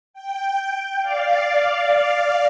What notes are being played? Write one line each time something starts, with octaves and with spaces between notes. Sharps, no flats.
G5
D5 F5